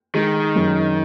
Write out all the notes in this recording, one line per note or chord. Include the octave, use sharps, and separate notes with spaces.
D#3 G#3
F#2